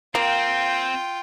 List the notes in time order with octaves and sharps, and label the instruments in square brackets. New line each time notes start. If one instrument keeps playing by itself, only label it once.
[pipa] A#3 [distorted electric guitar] C4 [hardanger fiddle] F4 G5